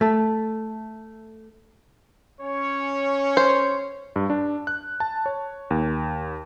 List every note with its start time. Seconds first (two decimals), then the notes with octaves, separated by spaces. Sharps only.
0.01 A3 A4
2.41 C#4 C#5
3.37 C5
4.16 G2
4.30 D4
4.67 F#6
5.00 A5
5.26 C#5
5.70 D#2